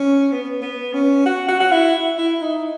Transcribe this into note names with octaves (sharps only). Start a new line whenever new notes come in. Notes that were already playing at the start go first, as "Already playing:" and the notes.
Already playing: C#4
B3
B3
C#4
F#4
F#4
F#4
E4
E4
D#4